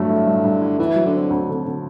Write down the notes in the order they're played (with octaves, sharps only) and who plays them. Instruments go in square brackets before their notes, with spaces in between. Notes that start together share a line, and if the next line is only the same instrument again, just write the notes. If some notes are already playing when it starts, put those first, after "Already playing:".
Already playing: [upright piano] G2 F#3 A3 [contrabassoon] D3
[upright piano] E4
G2
G2
E4
[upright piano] D2 [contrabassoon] E3
[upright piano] F#3
[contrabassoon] D3
[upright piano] C4
D2
D3
D3